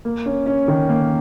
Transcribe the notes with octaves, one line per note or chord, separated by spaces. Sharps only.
A#3
C#4
C#4
D#3
A#3